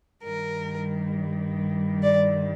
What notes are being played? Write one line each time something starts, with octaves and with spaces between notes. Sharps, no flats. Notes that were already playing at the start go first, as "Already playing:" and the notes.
G2 D#3 G3 A#4
D5